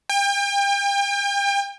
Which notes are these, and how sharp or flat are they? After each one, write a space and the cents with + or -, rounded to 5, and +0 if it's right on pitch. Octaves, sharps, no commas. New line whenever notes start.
G5 +35